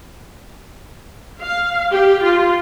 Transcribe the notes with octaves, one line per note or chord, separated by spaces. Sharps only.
F5
G4
F4